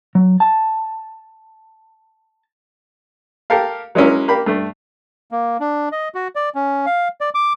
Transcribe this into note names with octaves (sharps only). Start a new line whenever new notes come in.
F#3
A5
G4 A4 A#4 F5
F#3 G#3 A#3 C#4 E4
A#3 G4 B5
G2 A3
A#3
D4
D#5
F#4
D5
C#4
F5
D5
D6